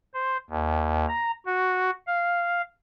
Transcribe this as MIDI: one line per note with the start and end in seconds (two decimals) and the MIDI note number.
0.14 0.37 72
0.50 1.06 39
1.08 1.31 82
1.46 1.90 66
2.07 2.62 77